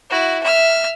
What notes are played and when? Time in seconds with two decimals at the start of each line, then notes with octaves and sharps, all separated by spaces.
0.10 E4 F#4
0.44 E5 F6